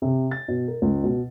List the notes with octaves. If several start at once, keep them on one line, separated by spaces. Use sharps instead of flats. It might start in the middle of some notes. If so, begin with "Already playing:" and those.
C3
A6
B2
A#4
C#2
B2